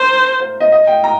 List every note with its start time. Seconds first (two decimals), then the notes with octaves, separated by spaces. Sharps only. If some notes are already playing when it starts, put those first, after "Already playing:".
Already playing: A#4 C5
0.40 C5
0.60 D#5
0.72 D#5
0.87 G5
1.04 A#5